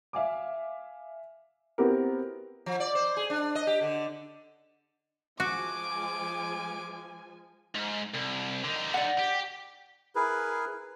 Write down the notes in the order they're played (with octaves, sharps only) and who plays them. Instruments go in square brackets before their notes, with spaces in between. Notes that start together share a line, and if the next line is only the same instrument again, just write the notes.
[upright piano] E5 F5 G#5 D6
B3 C4 E4 F#4 G4 A#4
[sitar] F3
D5
C5
G#4
D4
D#5
G4
D3
[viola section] F3 G#3 G#5 [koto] F#4 [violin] D6
[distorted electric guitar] G#2
C2
D3 D#4
[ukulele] D5 F#5
[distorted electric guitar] G4
[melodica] E4 G#4 A#4 B4